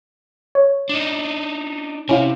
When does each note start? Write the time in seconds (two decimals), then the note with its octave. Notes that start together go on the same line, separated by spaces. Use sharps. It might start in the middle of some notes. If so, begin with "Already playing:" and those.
0.55 C#5
0.89 D4 D#4
2.09 C3 C#4 E4 F5